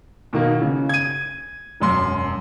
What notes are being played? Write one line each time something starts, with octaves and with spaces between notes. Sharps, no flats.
B2 D#3 A#3
C#3
G#6 D#7
E1 F#2 C6